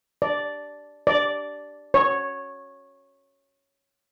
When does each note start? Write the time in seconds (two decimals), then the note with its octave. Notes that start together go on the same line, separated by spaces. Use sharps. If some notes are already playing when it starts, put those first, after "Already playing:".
0.22 D5
1.07 D5
1.94 C#5